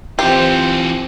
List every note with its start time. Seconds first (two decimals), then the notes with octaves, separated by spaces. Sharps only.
0.19 E3 C4 F4 G4 C5